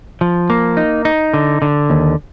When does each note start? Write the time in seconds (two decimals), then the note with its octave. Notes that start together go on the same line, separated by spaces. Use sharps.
0.21 F3
0.50 A#3
0.77 D#4
1.05 D#4
1.34 D3
1.62 D3
1.90 D#2